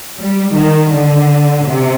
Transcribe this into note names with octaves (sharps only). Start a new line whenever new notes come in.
G3
D#3
D3
C3